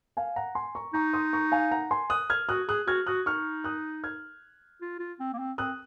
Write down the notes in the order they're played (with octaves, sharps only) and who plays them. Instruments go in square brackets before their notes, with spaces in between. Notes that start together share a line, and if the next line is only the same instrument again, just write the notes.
[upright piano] F5 G#5
F#5 A#5
G#5 C6
A#5 C#6
[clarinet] D#4 [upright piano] A#5 C#6
[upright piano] C6 D#6
A#5 C#6
F5 G#5
F#5 A#5
G#5 C6
D#6 F#6
F6 G#6
[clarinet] F#4 [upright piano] D#6 F#6
[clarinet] G#4 [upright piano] D#6 F#6
[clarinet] F#4 [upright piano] F6 G#6
[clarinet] F#4 [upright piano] D#6 F#6
[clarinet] D#4 [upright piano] C#6 F6
[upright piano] D#6 F#6
F6 G#6
[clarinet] F4
F4
C4
A#3
C4
[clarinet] C4 [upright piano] D#6 F#6